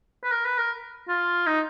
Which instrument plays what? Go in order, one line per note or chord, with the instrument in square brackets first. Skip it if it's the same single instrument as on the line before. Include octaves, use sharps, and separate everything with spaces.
[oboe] B4
A#4
B4
A#4
F4
D#4